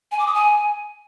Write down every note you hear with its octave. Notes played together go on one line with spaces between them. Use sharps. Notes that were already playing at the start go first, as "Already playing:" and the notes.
G#5
D6
D#6
G#5